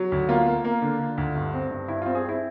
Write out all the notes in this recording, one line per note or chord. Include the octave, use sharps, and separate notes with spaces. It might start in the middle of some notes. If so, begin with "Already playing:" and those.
Already playing: F#3
D2
A#3 F4
A#3
A#3
D3
D3
D2
G2
C4
G2
G2 E4
C4 F4
G#4
C4 E4